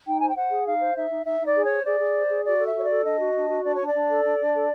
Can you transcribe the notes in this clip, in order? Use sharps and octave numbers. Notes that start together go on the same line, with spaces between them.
D#4 G5
C5 G#5
G5
C5 F#5
G#4
D#4 F5
C5
D#4 E5
D#4
D#4 E5
D#4 D5
G#4
C#5
C5
G#4 D5
G#4
C5
G#4
F#4 D5
A4 E5
F#4 C#5
A4 D5
D4 D#5
F#4
D4
F#4
D4 D5
D4 C#5
D5
D4
A4
D4
D4
A4